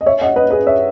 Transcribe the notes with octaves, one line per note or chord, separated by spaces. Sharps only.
D#5
C#5 E5
D#5 F#5
B4 D#5
G#4 B4
C#5 E5